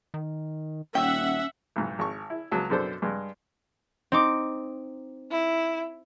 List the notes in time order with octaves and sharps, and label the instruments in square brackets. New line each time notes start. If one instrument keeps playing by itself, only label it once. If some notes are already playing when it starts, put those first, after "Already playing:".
[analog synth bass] D#3
[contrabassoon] D#1 [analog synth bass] C#4 [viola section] E5 F#5 [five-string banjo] G5
[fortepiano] B1 G#2
G#1 C#6
E4
C#2 F#3 A5
F#2 B2 D4 A4 C5
G2 G#3
[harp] C4 D#4 D6
[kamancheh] E4